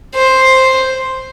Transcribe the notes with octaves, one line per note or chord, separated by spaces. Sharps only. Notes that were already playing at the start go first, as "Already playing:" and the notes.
C5